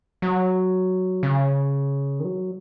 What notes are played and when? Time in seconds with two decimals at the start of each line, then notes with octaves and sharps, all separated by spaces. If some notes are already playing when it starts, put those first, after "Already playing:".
0.22 F#3
1.23 C#3
2.20 D#3
2.25 F#3